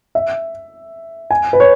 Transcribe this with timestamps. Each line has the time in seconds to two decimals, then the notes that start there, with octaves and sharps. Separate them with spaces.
0.15 E5
1.31 G#5
1.53 B4
1.60 C#5